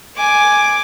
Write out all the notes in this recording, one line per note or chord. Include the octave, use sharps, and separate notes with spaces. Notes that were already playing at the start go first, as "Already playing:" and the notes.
G#5 D6